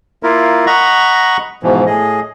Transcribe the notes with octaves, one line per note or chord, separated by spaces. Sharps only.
A#3 E4 F4 A#4
D#5 F#5 A#5 B5 C#6
G#2 B2 E3 F3
A2 G#4 D#5